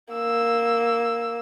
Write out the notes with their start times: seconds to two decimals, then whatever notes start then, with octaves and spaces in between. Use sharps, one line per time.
0.14 A#3 E6